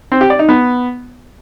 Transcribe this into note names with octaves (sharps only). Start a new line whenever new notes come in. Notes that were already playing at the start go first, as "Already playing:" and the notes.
C4
G4
D5
D#4
B3